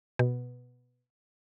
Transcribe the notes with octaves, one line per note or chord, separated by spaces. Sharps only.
B2